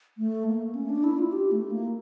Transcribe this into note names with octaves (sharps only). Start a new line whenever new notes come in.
A3
A#3
C#4
D4
E4
F4
G4
A3
A#3